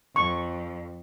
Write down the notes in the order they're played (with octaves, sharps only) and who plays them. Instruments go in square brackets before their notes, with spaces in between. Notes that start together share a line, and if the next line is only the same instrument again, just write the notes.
[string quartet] F2 [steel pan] C#6